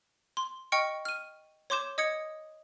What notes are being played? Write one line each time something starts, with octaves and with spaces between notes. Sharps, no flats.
C6
D#5 G5 C#6 F6 C#7 D7
F6 D#7
C#5 C6 D6 G6 E7
D#5 D#6 G#6 C#7